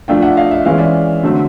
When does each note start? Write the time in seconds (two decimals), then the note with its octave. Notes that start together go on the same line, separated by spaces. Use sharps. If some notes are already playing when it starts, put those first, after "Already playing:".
0.08 F3 A3 D4 F5 G5
0.22 E5 F#5
0.37 D#5 F5
0.51 E5
0.65 E3 G#3 C#4 F5
0.78 D5 E5
1.23 D3 F#3 A3 C4